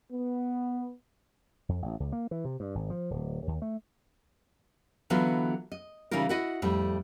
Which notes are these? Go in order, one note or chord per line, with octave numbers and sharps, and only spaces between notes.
B3
F2
A1
C#2
A#3
E3
C3
G2
G#1
F3
D1
D#2
A3
D3 E3 F#3 B3 F4 F#4
D#5
C#3 E3 G3 D#4 F4 A#4
E4 F#4 D#5
F2 A2 G3 A3